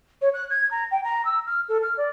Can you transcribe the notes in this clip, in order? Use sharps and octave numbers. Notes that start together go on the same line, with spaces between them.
C#5
F#6
G#6
A#5
G5
A#5
E6
F6
A4
F6
D5